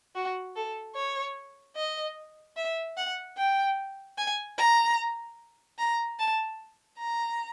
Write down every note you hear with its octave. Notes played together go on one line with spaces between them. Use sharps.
F#4
A4
C#5
D#5
E5
F#5
G5
G#5
A#5
A#5
A5
A#5